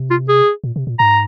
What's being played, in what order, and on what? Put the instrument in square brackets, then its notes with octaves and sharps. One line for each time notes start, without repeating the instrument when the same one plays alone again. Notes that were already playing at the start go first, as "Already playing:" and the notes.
Already playing: [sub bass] C3
[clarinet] F4
G#4
[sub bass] A#2
C3
A#2
[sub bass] G#2 [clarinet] A#5